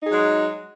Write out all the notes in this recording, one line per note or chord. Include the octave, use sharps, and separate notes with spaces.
F#3 G#3 D#4 G#4